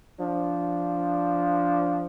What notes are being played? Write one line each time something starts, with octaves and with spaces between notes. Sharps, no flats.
F3 D4